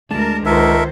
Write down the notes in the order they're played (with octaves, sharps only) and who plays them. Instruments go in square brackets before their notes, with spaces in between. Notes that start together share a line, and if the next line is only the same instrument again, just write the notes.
[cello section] D2 A#4 [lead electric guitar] G#3 D4 [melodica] A5
[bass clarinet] C#2 [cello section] D#3 C5 [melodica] A4 A#4 E5